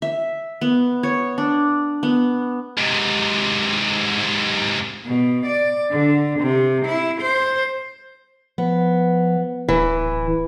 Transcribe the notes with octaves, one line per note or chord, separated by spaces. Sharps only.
E5
B3
C#5
D4
B3
G#2 C3
B2
D5
D3
C3
E4
C5
F3 B3
D1 E3